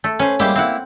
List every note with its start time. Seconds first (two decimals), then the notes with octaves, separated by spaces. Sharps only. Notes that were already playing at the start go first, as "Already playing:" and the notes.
0.04 A3
0.19 C#4 B4 C5
0.40 G3 G#3 A#3 E4 G4 C5
0.56 A#3 C4 E4 F#5